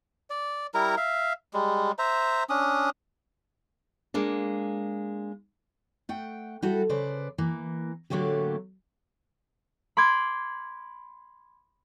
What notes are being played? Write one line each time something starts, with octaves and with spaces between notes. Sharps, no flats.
D5
G3 E4 A#4 A#5
E5 F5
G3 G#3
C5 E5 A#5
C#4 D4 D#6
G#3 A#3 D4
A3 F#5 G5
G3 E4 F#4 A4
C#3 B4 C5 D5
E3 A#3
A2 D3 F#3 A3 A#3 G4
B5 C6 D6 G#6